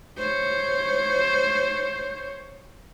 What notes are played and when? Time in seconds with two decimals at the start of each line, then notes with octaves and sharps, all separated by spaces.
0.18 C5 C#5